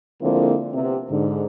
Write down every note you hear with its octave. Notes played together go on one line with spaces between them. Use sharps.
D3 F3 G#3 A#3 C4 E4
C3 B3
G#2 D3